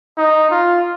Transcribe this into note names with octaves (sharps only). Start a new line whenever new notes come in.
D#4
F4